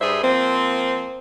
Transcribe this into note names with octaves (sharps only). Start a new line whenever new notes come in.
G2 G3 G#4 C5 E5
F3 A#3 C4